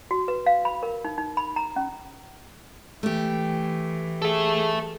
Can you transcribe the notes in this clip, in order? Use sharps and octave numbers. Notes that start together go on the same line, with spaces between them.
F#4
B4
F5
B5
A#4
D#4
D#4
B5
A#5
C#4
E3 A3 G4
G#4 A4 E5